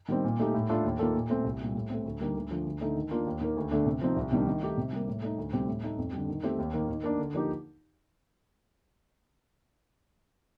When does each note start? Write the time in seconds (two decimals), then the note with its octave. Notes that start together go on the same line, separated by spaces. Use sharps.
0.08 D#3 G3 C4
0.24 A#2
0.40 A3 D#4 G4
0.54 A2
0.69 A3 D4 F4 A4
0.84 D#2
0.99 D#3 A#3 F4 A4
1.15 A#2
1.30 A3 C4
1.44 C2
1.60 A#2 G3
1.75 A2
1.90 A3 C4
2.05 D2
2.20 D3 G3 A#3 D#4
2.35 D2
2.50 D3 F3
2.66 D2
2.81 D3 A3 D#4
2.96 D#3
3.11 A#3 D4 F4
3.26 D#2
3.41 D#3 A#3
3.57 D2
3.71 D3 A3 D4
3.86 C3
4.01 F3 C4 D#4
4.16 C2
4.32 C3 D#3 G3 D4
4.47 D#3
4.62 A3 D#4 G4
4.77 C3
4.93 G3 A#3
5.07 A2
5.22 A3 D#4
5.38 D2
5.53 C3 G3 C4 G4
5.68 A2
5.83 A3 D#4 A4
5.98 F2
6.13 D3 G3
6.28 D#3
6.43 A3 C4 G4
6.59 D#2
6.74 D#3 A#3
6.88 D#3
7.04 A#3 D4
7.19 D3
7.34 F3 A#3 D#4 G4